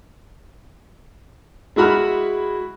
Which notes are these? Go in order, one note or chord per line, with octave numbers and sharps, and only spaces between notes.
G#3 E4 F#4 B5 F6